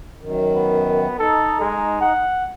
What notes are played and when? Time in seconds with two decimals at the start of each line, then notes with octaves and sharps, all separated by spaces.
0.21 F#2 D#3
0.54 B3
1.19 D#4 A4
1.61 G#3
2.01 F#5